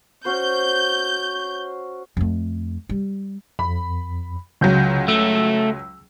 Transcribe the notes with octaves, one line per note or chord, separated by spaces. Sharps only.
C#4 F#4 C5 G6
F2 A3
G3
F2 B5
C#2 C#3 F#3 G6
A3 E6